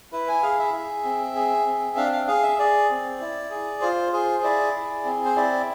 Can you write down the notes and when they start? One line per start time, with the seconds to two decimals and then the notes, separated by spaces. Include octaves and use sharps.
0.13 E4 B4
0.28 G#5
0.43 G#4 F5
0.59 E5
0.74 G#4
1.04 C4
1.35 G#4
1.66 C4
1.97 D4 F5
2.12 F5
2.27 G#4 F5
2.43 E5
2.59 G#4 D5
2.90 C4
3.21 E4
3.51 G#4
3.81 F4 C5
4.12 G#4 C5
4.43 E4 D5
4.74 G#4
5.05 C4
5.25 C5
5.36 E4 D5